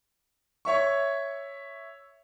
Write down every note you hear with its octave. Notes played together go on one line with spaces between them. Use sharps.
C#5 E5 C#6